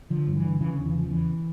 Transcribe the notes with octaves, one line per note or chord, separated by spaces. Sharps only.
D3 F3
G2
E3
D3
C#3 E3
E2 D3
E3
C#3 F3
E2 E3